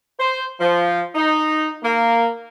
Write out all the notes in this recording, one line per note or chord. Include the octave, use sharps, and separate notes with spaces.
C5
F3
D#4
A#3